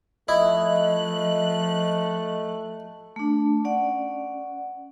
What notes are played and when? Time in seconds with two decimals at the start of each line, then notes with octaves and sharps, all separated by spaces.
0.29 F3 A3 E4 D#5 F#6
3.16 A3 D4
3.65 C#4 D5 F#5